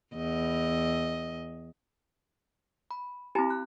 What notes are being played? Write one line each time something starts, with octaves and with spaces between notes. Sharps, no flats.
E2 D#5
B5
C4 E4 G4 G#5 B5
F#6